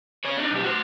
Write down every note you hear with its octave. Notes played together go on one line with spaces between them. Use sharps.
G#4 C#5
D4 D#4
B1 G4
F#4 C5